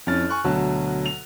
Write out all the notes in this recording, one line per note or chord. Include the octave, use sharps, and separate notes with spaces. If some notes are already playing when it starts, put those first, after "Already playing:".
F2 C#4 E4 F6 A6
G#5 C#6 F#6
D2 B2 F#3 A5
F7